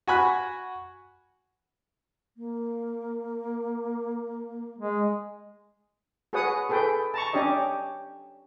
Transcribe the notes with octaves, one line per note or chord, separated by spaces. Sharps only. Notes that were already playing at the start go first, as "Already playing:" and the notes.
F#4 G#5 B5 F#6
A#3
G#3
F#4 G#4 B4 C#5 F#5 D#6
G#4 A4 B4 G5
A5 A#5 C#6
C#4 D4 G4 C#5 D#5